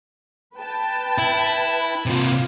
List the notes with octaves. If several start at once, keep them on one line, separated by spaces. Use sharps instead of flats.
B4 G5 A5
E4
C3 A#3 F4